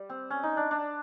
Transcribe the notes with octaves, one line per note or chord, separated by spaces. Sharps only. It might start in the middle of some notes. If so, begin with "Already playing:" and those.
Already playing: G3
C4
C#4
D#4
D4
D4